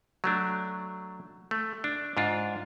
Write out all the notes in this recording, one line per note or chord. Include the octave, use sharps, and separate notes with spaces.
F#3 A3 D4
A3
D4
G#2 D4 F4